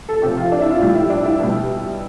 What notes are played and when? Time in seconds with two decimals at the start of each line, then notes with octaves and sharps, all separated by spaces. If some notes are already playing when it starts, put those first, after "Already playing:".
0.09 A4
0.22 C3 G4
0.26 F3
0.37 F4
0.52 D4
0.61 E4
0.71 F4
0.81 A2 G3 F4
0.95 E4
1.10 D4
1.26 E4
1.40 B2 G3